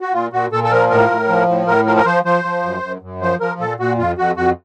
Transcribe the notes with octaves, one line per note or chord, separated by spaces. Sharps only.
F#4
A#2 F4
A#2 F#4
A#2 A4
A4
F3 A#4
A2 A#4
A2
F3
A2
A2 A#4
F3 A#4
A#4
F3 C5
F3 C5
F3
F#2
F#2
F#2
F3 C5
F3 A#4
A#2 A4
A#2 F#4
F2 F4
F2 F#4
F2 F#4